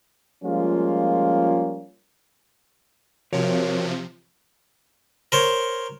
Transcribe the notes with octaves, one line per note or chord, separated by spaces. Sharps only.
F3 G3 G#3 A#3 C#4 F4
C3 F3 F#4 A#4 C#5
A#4 C5 C#5